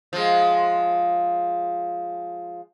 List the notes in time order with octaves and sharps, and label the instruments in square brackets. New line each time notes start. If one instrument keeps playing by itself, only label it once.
[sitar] F3 G#3